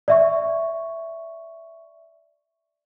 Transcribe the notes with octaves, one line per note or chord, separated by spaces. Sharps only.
D5 E5 C#6